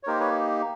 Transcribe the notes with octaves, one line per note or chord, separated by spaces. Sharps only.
C#5
A#3 D#4 G4 A#4 C5
B4 C#5